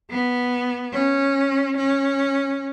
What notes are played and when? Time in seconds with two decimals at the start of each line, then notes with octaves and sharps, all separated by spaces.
0.10 B3
0.93 C#4
1.77 C#4